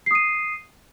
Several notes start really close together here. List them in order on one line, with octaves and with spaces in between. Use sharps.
C7 D#6 D#7